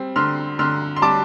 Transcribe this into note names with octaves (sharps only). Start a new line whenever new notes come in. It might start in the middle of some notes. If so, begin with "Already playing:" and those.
Already playing: G3 C4
D3 C6 F6
D3 C6 F6
C6
G3 A5 D6